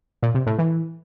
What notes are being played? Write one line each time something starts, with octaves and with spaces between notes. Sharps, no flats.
A#2
C3
A2
E3